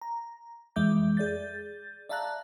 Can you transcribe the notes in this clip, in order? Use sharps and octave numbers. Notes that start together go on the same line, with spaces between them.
A#5
F2 E3 G#3 E5 D6 G6
G#4 D5 G6 A6
D5 E5 F5 A5 A#5 F#6